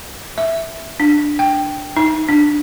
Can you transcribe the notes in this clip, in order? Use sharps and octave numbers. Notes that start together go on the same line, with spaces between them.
E5
D4
G5
D#4
D4